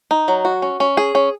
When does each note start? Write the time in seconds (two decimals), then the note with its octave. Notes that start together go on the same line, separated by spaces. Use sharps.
0.11 D#4
0.28 F#3
0.45 F#4
0.62 C#4
0.80 C#4
0.97 G#4
1.15 C#4